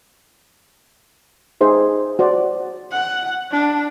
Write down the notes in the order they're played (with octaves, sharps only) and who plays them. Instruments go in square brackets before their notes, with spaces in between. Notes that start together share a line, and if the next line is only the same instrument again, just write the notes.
[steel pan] D#4 G#4 C5 E5
F#4 C5 D5
[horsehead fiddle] F#5
D4